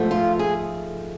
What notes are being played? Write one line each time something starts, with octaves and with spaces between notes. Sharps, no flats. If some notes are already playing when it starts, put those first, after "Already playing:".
Already playing: G#2 F3 A3
F4
G#4